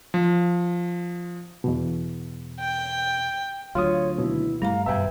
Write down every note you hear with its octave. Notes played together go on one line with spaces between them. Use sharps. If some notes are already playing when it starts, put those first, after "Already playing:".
F3
E2 B2
G5
D2 F#3 F4 C#5 D#6
D#2 B2 E4
G2 G3 A3 F5 A#5
G#1 F#2 B2 G3 B4 E5 G5 G#5